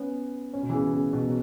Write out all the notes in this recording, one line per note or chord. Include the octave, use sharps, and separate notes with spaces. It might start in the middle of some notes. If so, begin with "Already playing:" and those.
Already playing: B3 C#4
C#4
B2
E3
C#3
B2
C#3
B2
F#3